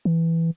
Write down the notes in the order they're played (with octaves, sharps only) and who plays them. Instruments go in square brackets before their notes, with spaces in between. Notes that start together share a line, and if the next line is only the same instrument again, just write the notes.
[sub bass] E3